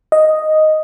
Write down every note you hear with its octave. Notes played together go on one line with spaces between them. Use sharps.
D#5